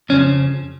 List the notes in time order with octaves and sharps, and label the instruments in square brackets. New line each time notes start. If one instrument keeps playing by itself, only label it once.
[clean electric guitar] F2 C#3 F3 C#4